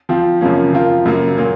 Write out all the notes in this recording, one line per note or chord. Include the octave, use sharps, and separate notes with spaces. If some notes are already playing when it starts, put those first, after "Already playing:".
F3 C4 F4
F#2 C#3 F3 A#3 C#4
F3 C4 F4 A#4
F#2 C#3 F#3 A#3
A#2 F#3 A#3